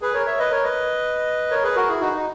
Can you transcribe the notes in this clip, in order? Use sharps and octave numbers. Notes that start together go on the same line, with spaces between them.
G#4 B4
A#4 C#5
C#5 E5
B4 D#5
A#4 C#5
B4 D#5
A#4 C#5
G#4 B4
F#4 A#4
E4 G#4
D#4 F#4
D#4